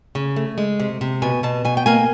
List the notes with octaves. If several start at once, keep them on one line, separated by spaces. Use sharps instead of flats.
C#3
A3
G#3
C3
C3
B2 G#5
B2 A5
B2 G#5
G5
A#3 G#5